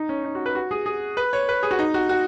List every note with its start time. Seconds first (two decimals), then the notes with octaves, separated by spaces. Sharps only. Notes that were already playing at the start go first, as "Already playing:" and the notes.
Already playing: D#4
0.09 C#4
0.24 D#4
0.35 F#4
0.46 B4
0.55 F#4
0.71 G#4
0.86 G#4
1.17 B4
1.33 C#5
1.49 B4
1.63 G#4
1.71 F#4
1.79 D#4
1.94 F#4
2.09 F#4